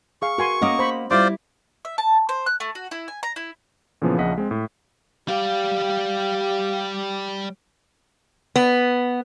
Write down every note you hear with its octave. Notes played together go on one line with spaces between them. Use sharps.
G#4 F5 C#6
F#4 A#4 G#5 C6
A#3 C#4 D#5 F#5 D6
C5 B5
G3 E4 F4 C5 D5 D6
E5
A5
C5
F#6
A3
F#4
E4
G#5
A#5
E4
A#2 C#3 E3 F3 B3
A#1 C#3 F3 D#5 F#5 B6
G#3 C4
A2
G3 G4 D5 F5
B3